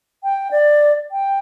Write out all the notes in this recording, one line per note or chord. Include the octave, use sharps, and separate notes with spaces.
G5
D5
G5